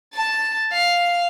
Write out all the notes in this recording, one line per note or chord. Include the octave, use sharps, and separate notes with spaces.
A5 A6
F5